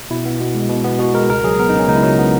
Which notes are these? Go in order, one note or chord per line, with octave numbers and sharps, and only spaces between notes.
B2 E4
B3
B2
G#3
B2
B3
B2 F#4
G#3 A#4
C#2 A#4
F#3 G#4
B3 A#4
C#3 D#4
C#4
C#2 D#4
E4
F#3 D#4
B3